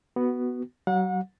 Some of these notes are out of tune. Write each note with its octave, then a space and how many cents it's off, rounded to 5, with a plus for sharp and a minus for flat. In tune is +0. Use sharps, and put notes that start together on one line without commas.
B3 +0 F#4 +10
F#3 +35 F#5 -35